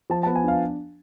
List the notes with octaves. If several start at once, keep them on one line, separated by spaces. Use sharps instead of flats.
F3 A5
A5
B3
G#5
D4 F5